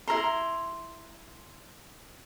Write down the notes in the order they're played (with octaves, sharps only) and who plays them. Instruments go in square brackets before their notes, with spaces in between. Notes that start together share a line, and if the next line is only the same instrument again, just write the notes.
[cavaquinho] E4 A#4 A#5 C6